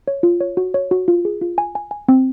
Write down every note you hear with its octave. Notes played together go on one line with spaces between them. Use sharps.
C#5
F4
C#5
F#4
C#5
F#4
F4
G#4
F4
G#5
G#5
G#5
C4